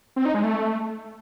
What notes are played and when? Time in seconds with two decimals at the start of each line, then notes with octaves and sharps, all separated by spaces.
0.16 C4
0.25 D#4
0.34 G#3
0.43 A3